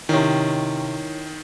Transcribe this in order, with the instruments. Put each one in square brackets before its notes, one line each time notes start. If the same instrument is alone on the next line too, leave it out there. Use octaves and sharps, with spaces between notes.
[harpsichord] C3 C#4 [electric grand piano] D#3 [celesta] E4 C#5